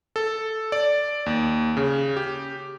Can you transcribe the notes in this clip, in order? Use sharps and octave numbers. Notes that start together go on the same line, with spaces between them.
A4
D5
D#2
C#3
G4